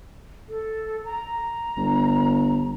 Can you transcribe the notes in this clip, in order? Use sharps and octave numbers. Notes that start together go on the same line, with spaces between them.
A4
A#5
G1